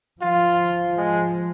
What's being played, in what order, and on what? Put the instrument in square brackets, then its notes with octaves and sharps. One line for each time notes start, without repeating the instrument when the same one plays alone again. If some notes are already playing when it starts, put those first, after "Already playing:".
[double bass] F3 [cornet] F4
[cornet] G#3